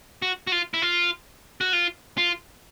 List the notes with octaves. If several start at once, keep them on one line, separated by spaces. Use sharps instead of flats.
F#4
F#4
F4
E4
F4
F#4
F4
F4